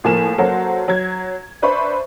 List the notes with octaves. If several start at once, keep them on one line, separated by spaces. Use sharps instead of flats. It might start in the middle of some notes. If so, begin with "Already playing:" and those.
A2 F3 A#3 G#5 E7
F#3 A#3 F#4 A4 C5
F#3 G#6
D4 B4 C5 E5 B5 C#6